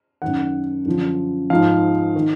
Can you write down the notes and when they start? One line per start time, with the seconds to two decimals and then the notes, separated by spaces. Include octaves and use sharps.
0.22 F#2 D#3 F#5
0.86 F#2 D3 F3
1.50 G#2 F3 F5
2.16 D#3